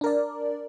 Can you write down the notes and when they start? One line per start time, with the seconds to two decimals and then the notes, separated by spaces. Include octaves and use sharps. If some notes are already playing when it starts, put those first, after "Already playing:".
0.01 D4
0.04 A#4
0.06 D5